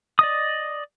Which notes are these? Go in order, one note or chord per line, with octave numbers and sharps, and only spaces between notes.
D5 D#5 D#6